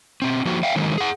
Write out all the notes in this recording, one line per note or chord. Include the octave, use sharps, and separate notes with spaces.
B2 C4
F3 A#3 F#4
E5 F5 G5
D3 D#3 F#3 G#3
G#4 F#5